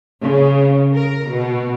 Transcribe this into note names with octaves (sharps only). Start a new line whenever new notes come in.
C#3
A#4
B2